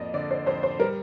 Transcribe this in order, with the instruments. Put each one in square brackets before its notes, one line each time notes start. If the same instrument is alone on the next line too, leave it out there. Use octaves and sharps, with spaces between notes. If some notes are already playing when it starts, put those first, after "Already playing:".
Already playing: [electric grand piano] F2 A#3 [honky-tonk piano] D5 D#5
[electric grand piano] D3 [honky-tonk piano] D5
[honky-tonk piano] C5
[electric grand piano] F2 [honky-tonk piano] C5
[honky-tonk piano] C5
[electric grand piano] G3 [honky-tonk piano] A#4